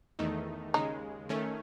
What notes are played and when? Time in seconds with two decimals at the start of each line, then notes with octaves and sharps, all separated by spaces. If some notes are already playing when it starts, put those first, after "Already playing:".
0.19 E2 D#3 A3 D#4
0.74 D#2 C#3 G#3 D#4
1.29 D#3 A3 C#4